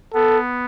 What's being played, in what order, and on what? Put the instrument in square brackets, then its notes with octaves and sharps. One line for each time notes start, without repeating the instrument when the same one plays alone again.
[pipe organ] B3 [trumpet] A4